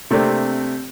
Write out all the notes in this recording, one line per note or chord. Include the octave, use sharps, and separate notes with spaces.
C3 A3 A#3 C4 D4